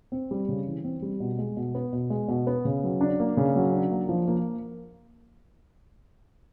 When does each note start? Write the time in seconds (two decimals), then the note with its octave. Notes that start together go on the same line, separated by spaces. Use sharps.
0.12 C4
0.31 G3
0.49 C#3
0.67 E3
0.84 C4
1.02 G3
1.20 B2
1.39 G#3
1.57 B2
1.75 B3
1.93 B2
2.10 G#3
2.28 B2
2.47 B3
2.65 C#3
2.84 F#3
3.01 D4
3.20 A#3
3.37 C#3
3.56 F#3
3.73 D4
3.91 A#3
4.09 F3
4.28 A#3